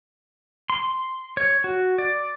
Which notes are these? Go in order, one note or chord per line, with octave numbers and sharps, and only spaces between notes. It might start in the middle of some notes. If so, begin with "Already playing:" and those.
C6
C#5
F#4
D5